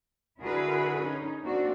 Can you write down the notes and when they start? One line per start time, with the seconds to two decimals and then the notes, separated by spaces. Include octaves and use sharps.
0.41 D3 E4 F#4 G#4 A#4 B4
1.01 C#4 D#4
1.43 A#3 C4 D4 F#4